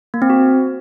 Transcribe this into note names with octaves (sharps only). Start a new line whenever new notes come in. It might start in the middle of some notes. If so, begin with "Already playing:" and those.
A#3
C4
F#4